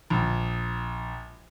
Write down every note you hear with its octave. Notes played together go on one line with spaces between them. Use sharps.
A#1